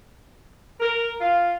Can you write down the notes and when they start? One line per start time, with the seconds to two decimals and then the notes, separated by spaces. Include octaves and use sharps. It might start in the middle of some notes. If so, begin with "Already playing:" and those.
0.80 A#4
1.21 F4